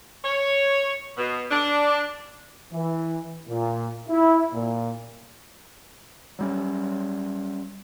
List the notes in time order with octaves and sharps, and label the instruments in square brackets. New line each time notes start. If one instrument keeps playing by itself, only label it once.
[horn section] C#5
B2
D4
[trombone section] E3
A#2
E4
A#2
[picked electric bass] F#3 G3 C#4